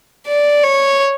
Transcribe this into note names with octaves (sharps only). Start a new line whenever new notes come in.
D5
C#5